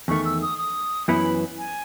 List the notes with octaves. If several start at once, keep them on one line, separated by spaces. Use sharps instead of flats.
E2 D#3 A3 C#6
E6
D#6
D#6
F#2 E3 B3 E4 B5
G#5